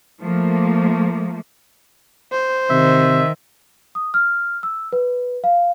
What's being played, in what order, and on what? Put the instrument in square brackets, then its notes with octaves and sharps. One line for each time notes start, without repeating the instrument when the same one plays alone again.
[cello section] F3 A3 A#3
[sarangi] C5
[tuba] C3 [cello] D#3 [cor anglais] E5
[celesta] D#6
F6
E6
B4
F5